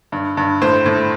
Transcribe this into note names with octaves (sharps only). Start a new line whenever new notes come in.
G2
G2
A2 C5
A2